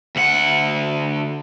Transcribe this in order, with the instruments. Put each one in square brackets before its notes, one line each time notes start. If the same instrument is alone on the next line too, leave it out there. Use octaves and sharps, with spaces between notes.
[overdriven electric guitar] D2 F#5